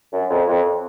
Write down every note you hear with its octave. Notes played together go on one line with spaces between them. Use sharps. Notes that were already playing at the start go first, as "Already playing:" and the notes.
F#2
F2
F2